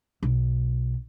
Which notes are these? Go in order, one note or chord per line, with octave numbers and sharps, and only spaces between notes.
B1